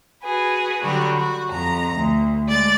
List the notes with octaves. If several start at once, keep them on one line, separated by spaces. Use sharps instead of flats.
F#4 G#4 B4
D3 F#3 G3 F#4
F#4
F2 A#5
D2
G#3 D5 A6